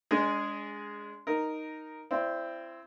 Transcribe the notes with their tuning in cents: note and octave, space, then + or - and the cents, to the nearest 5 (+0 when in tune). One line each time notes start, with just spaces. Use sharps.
G#3 +0 D4 -35 G#4 +0
D#4 +0 A#4 +0
C4 +0 E4 +30 D5 +0